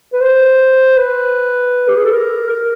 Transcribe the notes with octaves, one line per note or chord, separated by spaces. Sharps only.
B4
C5
B4
G4
G#4
A4
A#4
A#4